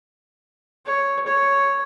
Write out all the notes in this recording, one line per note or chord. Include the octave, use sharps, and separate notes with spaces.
C#5
C#5